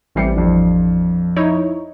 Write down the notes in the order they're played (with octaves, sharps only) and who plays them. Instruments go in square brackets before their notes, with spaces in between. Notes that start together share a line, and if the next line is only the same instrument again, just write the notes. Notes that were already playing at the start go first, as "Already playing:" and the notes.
[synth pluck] A1 E3 G3 [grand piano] C4 C7 C#7
[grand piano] F2 F3 D4
[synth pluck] D#4 E4 C#5